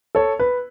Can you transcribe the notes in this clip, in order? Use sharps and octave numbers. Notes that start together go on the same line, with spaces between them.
A4 C#5
B4